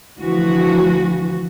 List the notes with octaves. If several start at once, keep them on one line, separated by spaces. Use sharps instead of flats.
D2 E3 F3 F#4